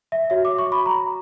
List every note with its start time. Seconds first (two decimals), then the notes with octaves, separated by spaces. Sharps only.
0.12 E5
0.30 F#4 C#5 E5
0.45 D6
0.59 C#6
0.72 B5
0.86 A#5